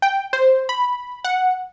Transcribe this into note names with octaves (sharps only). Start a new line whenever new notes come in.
G5
C5
B5
F#5